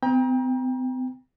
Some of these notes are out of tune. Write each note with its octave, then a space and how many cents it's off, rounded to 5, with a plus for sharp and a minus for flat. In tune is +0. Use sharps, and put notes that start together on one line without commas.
C4 -45 G5 +25 A#5 +35